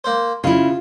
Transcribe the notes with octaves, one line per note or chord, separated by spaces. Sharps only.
A#3 C5
C#3 E4 F4